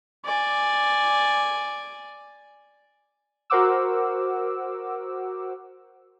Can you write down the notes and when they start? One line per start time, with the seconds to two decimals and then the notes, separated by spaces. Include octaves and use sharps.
0.25 D5 G#5
3.50 F#4 A#4 C5 F#5 D6 E6